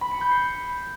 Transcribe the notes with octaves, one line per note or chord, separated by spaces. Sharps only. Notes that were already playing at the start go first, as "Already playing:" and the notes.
B5
C#7
G6
C7